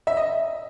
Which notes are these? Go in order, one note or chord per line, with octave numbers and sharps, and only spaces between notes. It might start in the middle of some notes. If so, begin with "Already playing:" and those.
E5
D#5